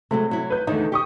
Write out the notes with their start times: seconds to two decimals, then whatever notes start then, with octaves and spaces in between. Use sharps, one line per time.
0.11 C3 F#3 G#3 A3
0.31 F#3 E4
0.50 B4 G6
0.67 E2 D3 D#3 A3 D#4
0.92 G4 G5 C#6 D#6